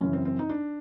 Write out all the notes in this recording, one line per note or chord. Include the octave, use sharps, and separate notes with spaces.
F#2 C#3 E3 C#4
C4
C4
D#4
D4